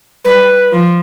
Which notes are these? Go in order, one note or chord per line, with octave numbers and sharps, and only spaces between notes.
G3 B4
F3